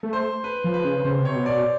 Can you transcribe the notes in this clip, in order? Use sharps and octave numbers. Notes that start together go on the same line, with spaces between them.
A3
C5
B4
F3
B4
C#3
C#3 C5
C3
C#5
B2
B2 D5